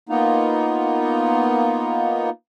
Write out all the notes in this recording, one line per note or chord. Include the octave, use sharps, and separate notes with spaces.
A#3 B3 D#4 F4